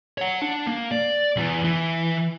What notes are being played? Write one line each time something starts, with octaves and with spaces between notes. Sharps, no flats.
C#5 F#5
D4
A#3
D5
E2 E3
E3